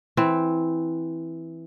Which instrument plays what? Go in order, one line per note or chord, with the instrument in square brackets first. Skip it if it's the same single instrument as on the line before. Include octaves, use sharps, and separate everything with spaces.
[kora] E3 C4